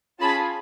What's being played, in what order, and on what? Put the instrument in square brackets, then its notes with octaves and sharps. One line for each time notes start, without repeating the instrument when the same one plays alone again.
[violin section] C#4 F4 G#4 A5 B5